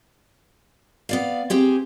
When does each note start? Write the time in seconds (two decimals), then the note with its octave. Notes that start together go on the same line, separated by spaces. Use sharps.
1.09 B3 D5 F5
1.50 C4 G4 G#4